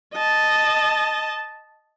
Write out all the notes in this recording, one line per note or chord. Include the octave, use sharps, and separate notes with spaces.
D#5 A5